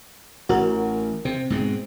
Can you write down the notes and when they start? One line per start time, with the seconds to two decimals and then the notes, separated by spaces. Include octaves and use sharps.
0.49 A1 F#4 A#4
1.25 C3 C4
1.50 G#2 B2 G#3